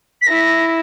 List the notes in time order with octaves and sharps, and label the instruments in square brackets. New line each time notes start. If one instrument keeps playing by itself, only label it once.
[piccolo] B6
[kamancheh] E4 [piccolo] A#6